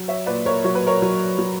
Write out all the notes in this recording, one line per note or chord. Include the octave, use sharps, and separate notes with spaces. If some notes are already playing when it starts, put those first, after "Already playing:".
Already playing: F#3
C#5 E5
A#2 B4 D5
A#4 C#5
F#3 C#5
B4
A#4 C#5
F#3
F#3